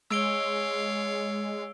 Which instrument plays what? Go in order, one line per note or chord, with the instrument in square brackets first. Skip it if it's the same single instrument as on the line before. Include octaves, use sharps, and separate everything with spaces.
[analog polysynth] G#3 [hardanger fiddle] C#5 F5 [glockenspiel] E6 D7 G7